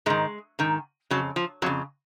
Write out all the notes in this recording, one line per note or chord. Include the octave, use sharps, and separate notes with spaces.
G#2 D#3 G#3
G#2 D#3
F2 C#3 F#3
F3
F2 C#3 F#3